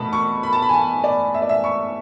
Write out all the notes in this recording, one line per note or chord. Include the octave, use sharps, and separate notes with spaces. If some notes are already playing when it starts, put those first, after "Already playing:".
Already playing: B2 A3 A5 B5
C#6
B5
A5
B5
G#5
A5
D5
E5
D5
E5
C#6